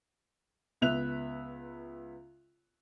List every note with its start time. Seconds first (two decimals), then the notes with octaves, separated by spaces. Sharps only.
0.81 C#2 B3 E5 F#6 F7